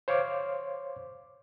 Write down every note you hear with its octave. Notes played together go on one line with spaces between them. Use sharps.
C5 C#5 F5 C6 D6